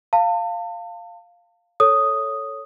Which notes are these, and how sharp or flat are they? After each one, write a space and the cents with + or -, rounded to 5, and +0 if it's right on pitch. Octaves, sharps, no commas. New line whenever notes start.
F5 +0 A5 +35
A4 +0 C#5 +0 D#6 +0